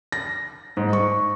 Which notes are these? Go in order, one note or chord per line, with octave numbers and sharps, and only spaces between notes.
A#6
G#2
C#6